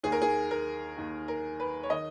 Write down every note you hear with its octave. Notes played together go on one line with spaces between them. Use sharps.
D#2 D#3 G#4
A#4
G#4
A#4
D#2 D#3
A#4
B4
C#5
D#3 D#5